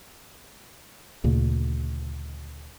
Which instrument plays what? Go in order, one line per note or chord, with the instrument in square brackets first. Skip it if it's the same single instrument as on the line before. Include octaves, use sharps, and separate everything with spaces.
[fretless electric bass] D2 A#2 C#3 A#3